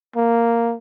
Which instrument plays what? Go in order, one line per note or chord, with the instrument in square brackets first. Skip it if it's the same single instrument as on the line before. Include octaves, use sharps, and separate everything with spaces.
[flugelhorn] A#3